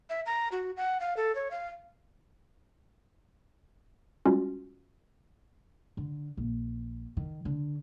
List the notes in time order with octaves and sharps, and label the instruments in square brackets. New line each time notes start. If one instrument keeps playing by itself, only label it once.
[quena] E5
A#5
F#4
F#5
F5
A4
C#5
F5
[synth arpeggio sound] G3 G#3 C#4 F4 F#4
[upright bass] D3
A#1
D#3
D3